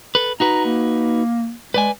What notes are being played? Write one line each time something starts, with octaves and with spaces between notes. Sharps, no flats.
A4 B4
D#4 F#4 B4 A#5
A#3
G#3 B4 D5 G#5